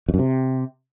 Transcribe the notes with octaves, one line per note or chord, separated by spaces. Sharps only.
F2
F#2
C3